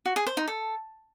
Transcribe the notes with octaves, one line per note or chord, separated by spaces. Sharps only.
F#4
G#4
C5
D#4
A4